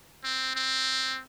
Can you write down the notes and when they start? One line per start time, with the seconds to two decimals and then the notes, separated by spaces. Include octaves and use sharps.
0.24 C4
0.55 C4